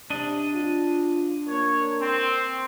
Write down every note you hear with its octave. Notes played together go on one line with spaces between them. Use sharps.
C3 D4 D#5
F4
A#3 C#5
C4